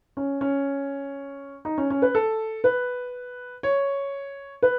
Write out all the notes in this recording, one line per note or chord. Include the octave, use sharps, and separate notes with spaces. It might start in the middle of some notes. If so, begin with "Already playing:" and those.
C#4
C#4
D#4
C#4
C#4
B4
A4
B4
C#5
B4